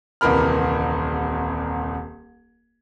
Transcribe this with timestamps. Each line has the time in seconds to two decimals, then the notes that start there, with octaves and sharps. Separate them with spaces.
0.21 D#1 C2 E3 A#4 B5 F6